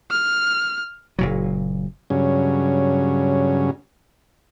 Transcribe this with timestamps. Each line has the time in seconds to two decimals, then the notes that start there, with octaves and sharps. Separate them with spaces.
0.11 F6
1.19 F#1 A#2 F#3
2.10 G2 C#3 F#3 C#4